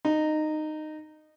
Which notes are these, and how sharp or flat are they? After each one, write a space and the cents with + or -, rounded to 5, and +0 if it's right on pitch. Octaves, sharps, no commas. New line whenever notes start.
D#4 -15